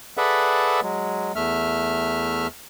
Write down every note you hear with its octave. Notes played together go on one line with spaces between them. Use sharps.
G#4 A4 B4 D5 E5 F#5
F#3 G#3
E2 A3 E5 F6